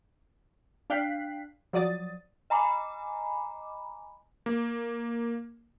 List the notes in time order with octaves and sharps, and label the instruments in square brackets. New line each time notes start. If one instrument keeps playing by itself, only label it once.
[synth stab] D4 F5 G5 F#6 B6 C7
F3 F#3 D5 D#6 A6
[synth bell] D#5 G#5 A#5 B5 D6
[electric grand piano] A#3